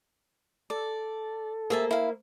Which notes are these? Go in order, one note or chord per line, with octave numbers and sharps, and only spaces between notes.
A4 D5
A#3 G#4 C5 E5 A5
E4 F5